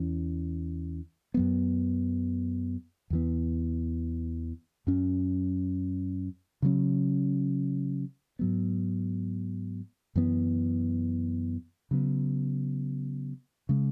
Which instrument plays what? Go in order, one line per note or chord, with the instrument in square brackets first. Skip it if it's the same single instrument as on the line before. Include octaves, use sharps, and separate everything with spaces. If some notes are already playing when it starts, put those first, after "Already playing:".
Already playing: [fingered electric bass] E2 E3 C#4
F#2 F#3 B3
E2 E3 B3
F#2 F#3 C#4
C#3 F#3 C#4
G#2 F#3 B3
F#2 E3 B3
C#3 F#3 B3
C#3 G#3